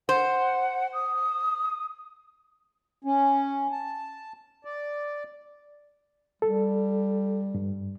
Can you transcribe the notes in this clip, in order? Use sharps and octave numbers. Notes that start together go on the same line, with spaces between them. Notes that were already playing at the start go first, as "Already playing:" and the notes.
C5 F#5
D#6
C#4
A5
D5
G3 A4
G2